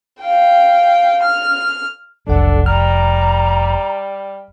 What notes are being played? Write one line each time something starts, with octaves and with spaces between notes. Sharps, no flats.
F5 G5
F6
F1 B1 D4 A4 F#5
G3 A#5 F6